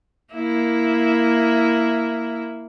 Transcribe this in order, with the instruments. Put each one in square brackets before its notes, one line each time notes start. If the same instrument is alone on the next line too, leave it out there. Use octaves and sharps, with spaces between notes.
[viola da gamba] A#3 E4